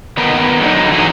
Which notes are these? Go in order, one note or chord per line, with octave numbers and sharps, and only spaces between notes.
D#3 B3 D#4 A#4 B4
D3 F#3 D#4
E3 F#3 D#4 G#4